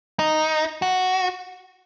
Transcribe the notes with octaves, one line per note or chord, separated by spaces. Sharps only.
D#4
F#4